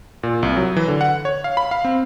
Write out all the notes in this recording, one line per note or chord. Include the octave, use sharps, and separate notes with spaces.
A#2
C2
F#3
E3
D3
F#5
C#5
F5
B5
F5
C4